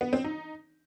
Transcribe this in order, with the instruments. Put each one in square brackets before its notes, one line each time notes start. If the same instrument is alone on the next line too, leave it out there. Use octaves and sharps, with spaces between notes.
[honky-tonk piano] B3
C4
D#4